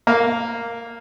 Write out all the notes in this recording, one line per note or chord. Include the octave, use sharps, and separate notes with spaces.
A#3